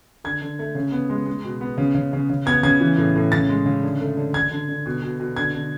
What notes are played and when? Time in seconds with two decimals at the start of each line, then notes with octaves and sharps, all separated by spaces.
0.24 D3 G#6
0.42 D3
0.59 A3
0.75 C#3
0.92 B3
1.10 G#3
1.26 G#3
1.44 B2
1.61 B3
1.78 C#3
1.95 C#3
2.13 C#3
2.29 C#3
2.46 B3 G#6
2.63 C#3 G#6
2.80 E3
2.97 A2
3.15 A2
3.32 C#3 A6
3.49 G#3
3.66 C#3
3.83 D3
4.01 A3
4.17 D3
4.34 D3 G#6
4.52 D3
4.69 D3
4.86 B2
5.02 B2
5.20 B2
5.36 D3 G#6
5.54 D3